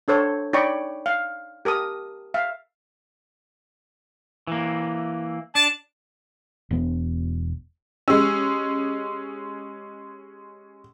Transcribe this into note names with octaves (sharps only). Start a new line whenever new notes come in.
D4 A4 C5 C#5
D#4 C#5 D5 G5 B5 C#6
F5
G4 A#4 A5 D#6
E5 F5
E3 A#3
D4 A5
E1 B3
G#3 C#4 G4 E6